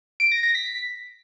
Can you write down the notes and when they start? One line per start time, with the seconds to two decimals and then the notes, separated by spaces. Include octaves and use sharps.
0.20 D7
0.32 A#6
0.43 A#6
0.55 B6